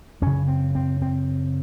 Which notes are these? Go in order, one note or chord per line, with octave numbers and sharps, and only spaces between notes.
F#2 C#3 C#4
C4
C4
C4